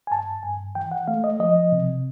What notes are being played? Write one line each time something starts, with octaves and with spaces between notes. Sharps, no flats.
G#5
G2 A5
G2 G#5
E3 G5
F#5
A3 F5
D#5
F3 D#5
C3